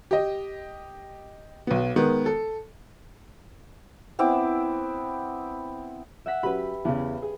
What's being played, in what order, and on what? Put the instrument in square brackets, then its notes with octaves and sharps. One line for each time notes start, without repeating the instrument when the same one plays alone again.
[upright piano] G4 D#5
B1 B3
D#3 G#3 B3
A4
[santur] B3 C4 E4 D6
[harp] E5 F#5 B6
[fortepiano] F#3 C#4 B5 [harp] G4 B4
[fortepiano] E2 C#3
G#4